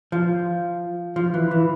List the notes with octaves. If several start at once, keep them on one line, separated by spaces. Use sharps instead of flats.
F3
F3
E3
E3